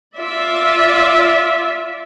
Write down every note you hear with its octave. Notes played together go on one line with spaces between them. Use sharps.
F4 D5 E5